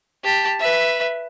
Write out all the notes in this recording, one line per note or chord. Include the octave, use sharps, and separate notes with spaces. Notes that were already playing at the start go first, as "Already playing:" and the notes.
G4 A5
B4 E5